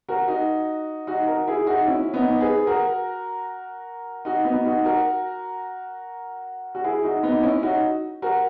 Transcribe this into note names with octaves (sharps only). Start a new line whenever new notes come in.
F#4 A#4
D#4 F#4
D#4 F#4
F#4 A#4
E4 G#4
D#4 F#4
C#4 E4
B3 D#4
G#4 B4
F#4 A#4
D#4 F#4
B3 D#4
D#4 F#4
F#4 A#4
F#4
E4 G#4
D#4 F#4
B3 D#4
C#4 E4
D#4 F#4
F#4 A#4